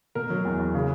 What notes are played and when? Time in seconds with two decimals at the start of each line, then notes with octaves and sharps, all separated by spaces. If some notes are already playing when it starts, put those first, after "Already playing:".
0.15 B2 A#4
0.30 F#3
0.45 E2
0.59 E2
0.74 C#3